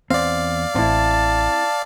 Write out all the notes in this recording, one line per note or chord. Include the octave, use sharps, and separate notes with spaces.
E2 C4 D5 F5
A1 C4 E4 A5